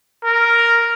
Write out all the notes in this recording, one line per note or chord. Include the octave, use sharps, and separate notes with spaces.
A#4